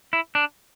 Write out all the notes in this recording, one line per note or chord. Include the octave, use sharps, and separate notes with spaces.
E4
D4